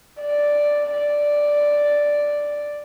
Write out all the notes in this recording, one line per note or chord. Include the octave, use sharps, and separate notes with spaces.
D5
D5